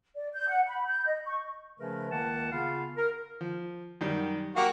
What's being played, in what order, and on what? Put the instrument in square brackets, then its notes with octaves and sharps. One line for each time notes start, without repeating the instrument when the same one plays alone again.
[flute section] D5
G6
F#5
B5
G6
D#5
C#6
[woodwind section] C#3 F3 A3 C#4 A#4 B4
C#2 D#3 A#3 F#5 A5
C#3 B3 F4 F5
A#4
[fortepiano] F3
F#2 D#3 G3
[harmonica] A#3 F#4 G4 [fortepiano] F5 A#5 D6